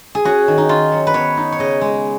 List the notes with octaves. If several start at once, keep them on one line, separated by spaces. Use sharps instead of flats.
G#4
C#4 F#4
D#3
D#4
D#3 F4
F#3
B4
B3 C#5
D#4
C#5
C#3 D#5
G#3